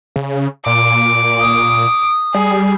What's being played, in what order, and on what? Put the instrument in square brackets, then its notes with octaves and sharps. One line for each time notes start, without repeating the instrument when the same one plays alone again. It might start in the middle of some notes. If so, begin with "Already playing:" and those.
[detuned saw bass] C#3
[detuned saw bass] A#2 [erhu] D6
[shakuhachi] D#6
[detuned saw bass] G3 [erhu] G#4